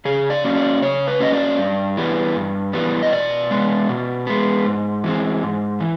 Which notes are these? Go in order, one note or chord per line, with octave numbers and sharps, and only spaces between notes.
C#3 G#4
D5
F#3 A#3 C#4
D5
C#3 C#5
B4
F#3 A#3 C#4 D#5
D5
G2
E3 G3 B3
G2
E3 G3 B3
D#5
B2 D5
G#3 B3
B2
G#3 B3
G#2
E3 G#3 C4
G#2
E3